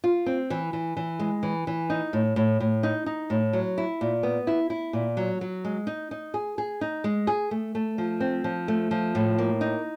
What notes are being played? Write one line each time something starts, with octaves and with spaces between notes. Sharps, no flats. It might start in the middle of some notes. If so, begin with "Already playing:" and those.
F4
C4
E3
E3
E3
G#3
E3
E3
D#4
A2
A2
A2
D#4
D#4
A2
F#3
E4
A#2
B3
E4
E4
A#2
F#3
F#3
G#3
D#4
D#4
G#4
G#4
D#4
G#3
G#4
A3
A3
F3
C4
F3
A3
F3
A2
A#3
D#4